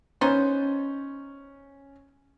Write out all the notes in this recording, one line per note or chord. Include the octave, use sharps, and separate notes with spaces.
B3 C#4 D#4 C5